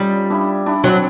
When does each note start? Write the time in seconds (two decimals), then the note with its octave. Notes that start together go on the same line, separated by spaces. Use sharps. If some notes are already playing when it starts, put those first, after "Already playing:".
Already playing: G3 C#4 D#4 F4
0.30 D4 E4
0.66 D4 E4
0.83 F#3 C4 D4